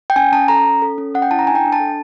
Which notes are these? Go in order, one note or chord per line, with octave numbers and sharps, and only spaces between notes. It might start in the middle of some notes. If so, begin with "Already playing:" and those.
G5
C#4 G#5
C#4 A5
A4 A#5
C#4
A4
C#4
C#4 F#5
G5
E4 A5
A#5
D4 G#5
G5
D4
A5
A4